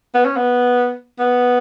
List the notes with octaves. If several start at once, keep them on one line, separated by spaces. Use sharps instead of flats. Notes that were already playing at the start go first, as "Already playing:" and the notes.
B3
C#4
B3
B3